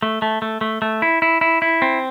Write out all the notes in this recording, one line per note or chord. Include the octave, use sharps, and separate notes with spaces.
A3
A3
A3
A3
A3
E4
E4
E4
E4
C4